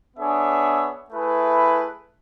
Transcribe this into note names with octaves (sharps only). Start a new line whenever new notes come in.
B3 D4 G#4 C#5 E5
A3 E4 G#4 B4